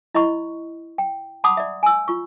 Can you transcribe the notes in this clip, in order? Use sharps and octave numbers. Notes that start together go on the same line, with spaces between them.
E4 D#5 B5 C#6
G5
F#5 A5 B5 D6 D#6
D5 E5
G#5 E6
F4 C#6